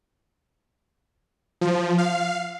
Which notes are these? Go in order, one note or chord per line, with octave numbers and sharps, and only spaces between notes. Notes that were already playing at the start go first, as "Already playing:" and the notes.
F3
F5